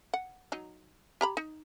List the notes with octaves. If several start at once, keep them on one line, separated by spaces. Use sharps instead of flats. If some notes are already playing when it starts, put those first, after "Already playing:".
F#5
F#3 D#4
G4 A#5 B5
D#4